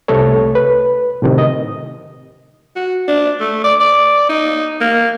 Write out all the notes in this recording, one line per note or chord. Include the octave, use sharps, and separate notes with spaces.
C2 C3 A3 A4 C#5
B4
A2 C3 D#3
D#5
F#4
D4
A3
D5
D5
D#4
A#3